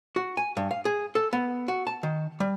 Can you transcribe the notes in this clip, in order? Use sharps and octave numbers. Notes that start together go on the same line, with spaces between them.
F#4
G#5
G2
F5
G#4
A4
B3
F#4
A5
D#3
G3